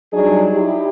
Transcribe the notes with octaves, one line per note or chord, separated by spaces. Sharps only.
F#3 G3 D4 D#4 G#4
D#4 E4 G4